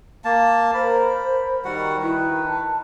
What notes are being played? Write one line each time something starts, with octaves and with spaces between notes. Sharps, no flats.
A#3 A5
A#4 C5 B5
D#3 G3 F#4 F#5
E4 B4
A5